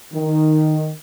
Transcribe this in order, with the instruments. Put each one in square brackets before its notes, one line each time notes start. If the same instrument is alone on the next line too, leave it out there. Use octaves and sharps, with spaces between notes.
[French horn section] D#3